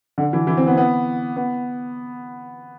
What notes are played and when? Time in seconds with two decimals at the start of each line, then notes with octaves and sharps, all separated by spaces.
0.18 D3
0.33 E3
0.47 E3
0.57 C4
0.67 B3
0.77 B3
1.36 B3